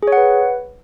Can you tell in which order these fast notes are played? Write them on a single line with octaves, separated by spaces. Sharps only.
G#4 C#5 F#5 B4